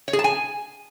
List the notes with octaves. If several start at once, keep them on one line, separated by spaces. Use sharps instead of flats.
C#5
G#4
A5
G#5